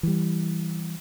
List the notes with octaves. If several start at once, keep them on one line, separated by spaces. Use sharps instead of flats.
E3 G3